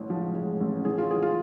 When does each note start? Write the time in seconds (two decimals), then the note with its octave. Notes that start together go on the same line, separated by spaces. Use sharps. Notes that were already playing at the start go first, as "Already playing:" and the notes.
Already playing: A1 A2 G#3
0.10 F3
0.35 G#3
0.60 A1
0.85 A2 G#4
0.98 F4
1.11 E3 G#4
1.22 F4